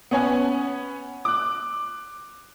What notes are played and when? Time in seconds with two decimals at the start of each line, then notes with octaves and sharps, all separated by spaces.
0.11 B3 C#4 C#5 F#5 G#5
1.25 D6 F#6